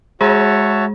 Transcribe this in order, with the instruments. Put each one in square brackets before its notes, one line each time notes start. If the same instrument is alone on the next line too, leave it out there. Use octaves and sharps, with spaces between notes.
[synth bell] G#3 G#4 [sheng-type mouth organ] F#4 C#5 E5 A5